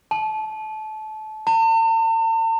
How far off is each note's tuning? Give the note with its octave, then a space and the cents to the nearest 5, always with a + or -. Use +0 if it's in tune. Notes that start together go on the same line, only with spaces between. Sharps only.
A5 -25
A5 +45